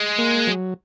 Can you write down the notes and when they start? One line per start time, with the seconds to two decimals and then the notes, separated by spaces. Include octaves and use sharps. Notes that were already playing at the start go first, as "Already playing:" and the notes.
Already playing: G#3
0.18 A#3
0.47 F#3